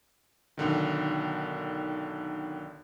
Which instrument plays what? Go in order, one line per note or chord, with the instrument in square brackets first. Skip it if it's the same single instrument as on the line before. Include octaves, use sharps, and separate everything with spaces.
[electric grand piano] B1 D3 D#3